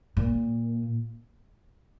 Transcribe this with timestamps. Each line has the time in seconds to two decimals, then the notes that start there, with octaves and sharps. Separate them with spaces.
0.17 A#2